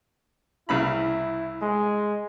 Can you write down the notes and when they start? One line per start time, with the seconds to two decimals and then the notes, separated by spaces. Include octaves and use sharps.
0.69 C2 C#3 E4 B5
1.62 G#3